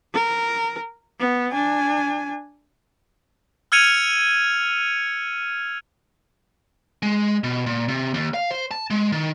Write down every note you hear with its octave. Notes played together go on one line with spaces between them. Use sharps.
A#4
B3
D4 G#5
E6 F6 G#6 C#7 D#7 F7
G#3
B2
A#2
C3
D#2
F5
C5
A5
G#3
D#3